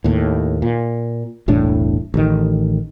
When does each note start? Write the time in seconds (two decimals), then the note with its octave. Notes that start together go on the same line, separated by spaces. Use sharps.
0.04 D#2 A2
0.62 A#2
1.48 E1 C2 A2 D4
2.14 A1 D#3